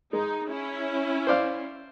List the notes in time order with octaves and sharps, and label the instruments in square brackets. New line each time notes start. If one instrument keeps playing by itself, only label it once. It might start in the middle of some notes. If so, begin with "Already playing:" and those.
[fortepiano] G#3 [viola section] D#4
[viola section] C#4 E4
[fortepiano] C5 D5 F5